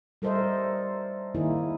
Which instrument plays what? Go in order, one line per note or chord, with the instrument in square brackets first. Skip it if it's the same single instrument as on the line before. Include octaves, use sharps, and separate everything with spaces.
[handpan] G3 A4 A#4 C5 D#5 E5
D#3 A#3 D#4 E4 G#4